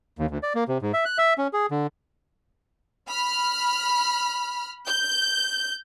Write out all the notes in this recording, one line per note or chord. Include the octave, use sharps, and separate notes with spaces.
D#2
D2
D5
A#3
C3
G#2
E5
F#6
E5
C#4
G#4
D3
B5 F6
G6